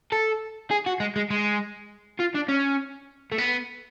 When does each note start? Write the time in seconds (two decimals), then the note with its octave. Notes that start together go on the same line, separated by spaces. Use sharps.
0.12 A4
0.71 G#4
0.87 F#4
1.00 G#3
1.16 G#3
1.30 G#3
2.20 F4
2.35 D4
2.49 C#4
3.32 A3
3.38 B3